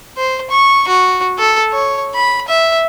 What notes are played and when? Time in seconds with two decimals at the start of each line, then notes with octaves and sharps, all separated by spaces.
0.17 C5
0.50 C#6
0.88 F#4
1.38 A4
1.72 C#5
2.15 B5
2.48 E5